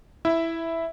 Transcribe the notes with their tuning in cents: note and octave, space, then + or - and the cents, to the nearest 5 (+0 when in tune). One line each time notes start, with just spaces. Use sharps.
E4 +0 E5 +0